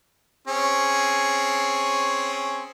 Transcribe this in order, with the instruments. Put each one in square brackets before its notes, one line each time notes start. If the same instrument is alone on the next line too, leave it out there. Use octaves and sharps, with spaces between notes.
[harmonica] C4 C#4 G#4